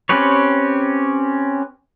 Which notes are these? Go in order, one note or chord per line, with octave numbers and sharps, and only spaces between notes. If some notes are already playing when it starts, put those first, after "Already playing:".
C4 C#4 G4 B4 C#5